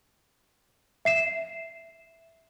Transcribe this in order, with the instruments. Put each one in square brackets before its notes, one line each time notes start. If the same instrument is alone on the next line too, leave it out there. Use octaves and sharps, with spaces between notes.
[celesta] E5 C7 E7